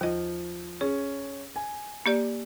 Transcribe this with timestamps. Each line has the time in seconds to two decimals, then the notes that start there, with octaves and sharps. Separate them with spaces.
0.01 D#2 F3 D#5
0.81 C#4 G#4
1.56 G#5
2.06 A#3 G4 D5